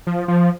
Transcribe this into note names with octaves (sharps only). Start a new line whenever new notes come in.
F3
F3